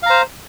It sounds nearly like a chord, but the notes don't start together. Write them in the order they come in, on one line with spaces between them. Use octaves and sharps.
F5 A#5 C5